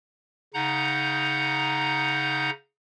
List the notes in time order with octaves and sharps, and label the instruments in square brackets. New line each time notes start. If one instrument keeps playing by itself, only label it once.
[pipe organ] C#3 D#4 F#5 A#5 G6